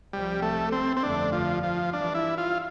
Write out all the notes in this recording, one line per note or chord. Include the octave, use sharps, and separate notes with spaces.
C2 C3 F3 G3 C4
A3
C4
C4
G1 F2 D3 A3 D4
F3
F3
G2 E3 G3 D4
E4
F4